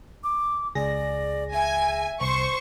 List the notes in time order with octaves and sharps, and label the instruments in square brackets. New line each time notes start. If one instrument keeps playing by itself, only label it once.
[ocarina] D6
[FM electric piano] C#2 G#4 A#6 [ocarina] D5
[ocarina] E5 [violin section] G#5
[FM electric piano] C2 [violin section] C5 C#6